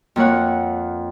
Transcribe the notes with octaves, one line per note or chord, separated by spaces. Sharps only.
F2 A#3 C#5 F#5